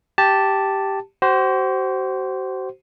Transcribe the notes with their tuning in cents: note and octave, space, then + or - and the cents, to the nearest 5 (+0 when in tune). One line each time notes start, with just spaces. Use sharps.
G4 -5 A5 +0
F#4 +40 C5 +0